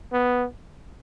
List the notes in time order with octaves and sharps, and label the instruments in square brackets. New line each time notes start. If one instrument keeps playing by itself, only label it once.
[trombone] B3